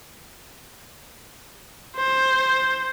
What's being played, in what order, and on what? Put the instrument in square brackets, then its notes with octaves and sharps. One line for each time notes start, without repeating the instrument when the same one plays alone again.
[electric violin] C5